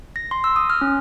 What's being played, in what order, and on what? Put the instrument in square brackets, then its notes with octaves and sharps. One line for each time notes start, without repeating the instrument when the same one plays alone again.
[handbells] A#6
C6
E6
D#6
F6
C#4